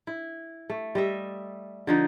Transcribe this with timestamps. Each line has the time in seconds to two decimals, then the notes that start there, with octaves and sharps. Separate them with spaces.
0.07 E4
0.70 A3
0.95 G3 D#5 E5
1.87 D3 F3 D#4